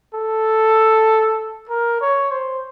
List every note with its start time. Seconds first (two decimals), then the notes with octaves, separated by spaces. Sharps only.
0.14 A4
1.70 A#4
2.01 C#5
2.31 C5